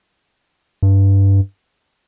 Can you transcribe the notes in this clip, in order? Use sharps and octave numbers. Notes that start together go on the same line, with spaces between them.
G2